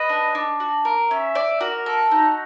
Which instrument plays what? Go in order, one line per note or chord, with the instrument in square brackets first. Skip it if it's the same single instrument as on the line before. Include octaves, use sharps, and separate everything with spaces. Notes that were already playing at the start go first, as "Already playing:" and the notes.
Already playing: [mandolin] B4 [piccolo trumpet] D#5
[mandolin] D4
D4
F#4
A#4
[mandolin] C#4 [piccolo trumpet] E5
[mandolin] D5
[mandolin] F#4 [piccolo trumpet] A#4
[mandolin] A4
[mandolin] D#4 [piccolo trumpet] F#4